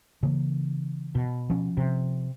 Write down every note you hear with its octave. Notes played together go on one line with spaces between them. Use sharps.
C#3 E3 A#3
B2
F3 C#4
C3